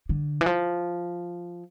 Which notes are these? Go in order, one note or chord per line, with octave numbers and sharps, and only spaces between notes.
D3
E3
F3